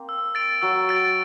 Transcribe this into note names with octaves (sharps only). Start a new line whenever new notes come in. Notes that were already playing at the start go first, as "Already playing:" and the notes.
Already playing: A#3 C4
E6
A6 D7
F#3 E6
A6 D7